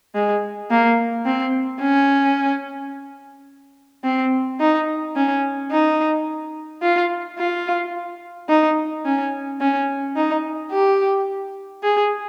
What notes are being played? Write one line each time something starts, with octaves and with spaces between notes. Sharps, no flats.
G#3
A#3
C4
C#4
C4
D#4
C#4
D#4
F4
F4
D#4
C#4
C#4
D#4
G4
G#4